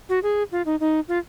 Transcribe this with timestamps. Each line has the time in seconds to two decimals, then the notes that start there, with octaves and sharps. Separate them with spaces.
0.09 F#4
0.23 G#4
0.52 F4
0.66 D#4
0.80 D#4
1.08 F4